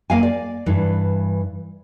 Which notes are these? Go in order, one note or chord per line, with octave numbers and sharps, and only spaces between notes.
A#3 F5 G#5
D5
G2 E3